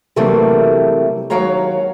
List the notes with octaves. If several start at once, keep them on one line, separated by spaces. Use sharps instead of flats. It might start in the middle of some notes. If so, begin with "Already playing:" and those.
C3 E3 F#3 G3 A3 A#3
D#2 F#3 F#4 C#5 F5 A#5